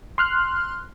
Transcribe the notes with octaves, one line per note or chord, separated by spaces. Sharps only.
C6 F6 F#6